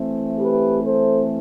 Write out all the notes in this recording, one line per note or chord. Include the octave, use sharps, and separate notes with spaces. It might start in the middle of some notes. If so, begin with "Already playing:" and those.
Already playing: E3 A3 C4
G4 B4
A4 C5